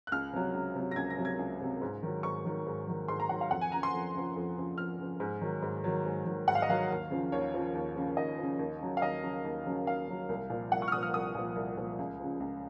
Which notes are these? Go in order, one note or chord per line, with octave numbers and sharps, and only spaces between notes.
F#6
C#2 F6
C3 F#3
C#2
C3 F#3
A#6
C#2 G#6
A#6
C3 F#3
G#6
C#2
C3 F#3
G#2
D#3 F#3
G#2 C#6
D#3 F#3
G#2
D#3 F#3
G#2 C6
A#5
D#3 F#3 F#5
F5
F2 F#5
G#5
C#3 F3 A#5
C6
F2
C#3 F3
F2
C#3 F3
F2 F6
C#3 F3
G#2
D#3 F#3
G#2
D#3 F#3
G#2
D#3 F#3
G#2 F#5
F5
D#5
D#3 F#3 F5
D#2
C#3 F3
D#2 C#5
C#3 F3
D#2
C#3 F3
D#2 D#5
F3
C#3
D#2
C#3 F#3
F5
D#2 D#5
C#3 F#3
D#2
C#3 F#3
D#2 F5
C#3 F#3
C2
A#2 F3
C2 F#5
C#6
F6
A#2 F3 D#6
F6
C2 D#6
A#2 F3
C2
A#2 F3
C#2
C#3 F3
C#2